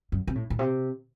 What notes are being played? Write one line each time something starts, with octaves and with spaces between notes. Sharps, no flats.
F#2
C3
A2
A2
C3